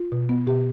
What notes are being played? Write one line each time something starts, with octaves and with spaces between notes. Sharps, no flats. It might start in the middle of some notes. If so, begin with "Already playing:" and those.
Already playing: F4
B2
B3
B2 G4